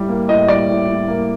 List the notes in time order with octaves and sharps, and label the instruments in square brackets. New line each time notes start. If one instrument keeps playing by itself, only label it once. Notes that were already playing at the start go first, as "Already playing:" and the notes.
Already playing: [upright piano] A2 G3
A#3
[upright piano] A2 [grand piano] D#5
[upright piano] G3 [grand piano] D5
[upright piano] A2
A2
A#3